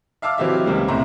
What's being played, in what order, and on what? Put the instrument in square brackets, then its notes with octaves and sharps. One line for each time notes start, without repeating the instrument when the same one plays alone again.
[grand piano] E5 F5 A5 D6 E6 F6
E3 F#3 C4 G4 D#5 E5
C#2 G3 G#3 A#3
C2 A2 E4 A#5 C6